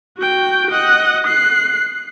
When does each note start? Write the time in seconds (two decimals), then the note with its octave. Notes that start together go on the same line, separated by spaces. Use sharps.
0.18 F#4 G5
0.71 D#5 F#5
1.27 F#6 C7